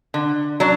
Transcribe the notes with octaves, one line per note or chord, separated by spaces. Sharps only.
D3
F#3 D4